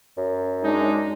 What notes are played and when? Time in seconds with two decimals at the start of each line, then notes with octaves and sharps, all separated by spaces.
0.17 F#2
0.62 G#3 D4 D#4